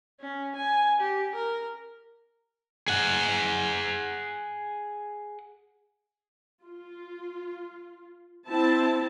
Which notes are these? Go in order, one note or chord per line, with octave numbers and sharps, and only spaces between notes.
C#4
G#5
G4
A#4
G#4 F#5
F4
C4 E4 A5